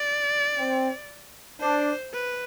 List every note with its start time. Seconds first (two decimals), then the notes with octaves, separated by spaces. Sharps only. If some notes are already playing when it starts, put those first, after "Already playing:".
Already playing: D5
0.58 C4
1.60 D4 C5
2.12 B4